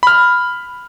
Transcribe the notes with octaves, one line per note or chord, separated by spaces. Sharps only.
B5 F6